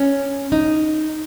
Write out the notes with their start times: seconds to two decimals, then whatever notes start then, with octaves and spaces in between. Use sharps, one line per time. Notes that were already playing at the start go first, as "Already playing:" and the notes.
Already playing: C#4
0.52 D#4